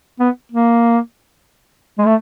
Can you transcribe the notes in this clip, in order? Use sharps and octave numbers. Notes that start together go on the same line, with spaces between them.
B3
A#3
G#3
A3